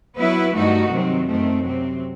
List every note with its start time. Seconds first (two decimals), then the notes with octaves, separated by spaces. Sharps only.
0.17 F#3 B3 E4 B4
0.54 G2 D#3 A3 D#4 F#4
0.91 C3 D#3 F#3 C4
1.26 F#2 D#3 A3 C4
1.64 C3 F#3 C4